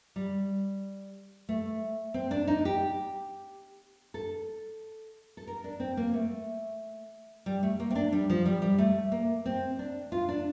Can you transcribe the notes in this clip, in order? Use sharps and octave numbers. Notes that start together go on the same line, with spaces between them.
G3
A3
C4
D4
D#4
G4
A4
A4
A#4
D4
C4
A#3
A3
G3
A3
A#3
C4
D4
G3
F3
G3
G3
A3
A#3
C4
D4
F4
D4